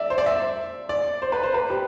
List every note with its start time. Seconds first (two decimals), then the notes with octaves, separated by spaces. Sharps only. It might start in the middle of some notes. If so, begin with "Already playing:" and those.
Already playing: D5 E5
0.10 C5
0.18 D5
0.26 E5
0.89 D5
1.22 C5
1.32 B4
1.43 C5
1.54 B4
1.70 G4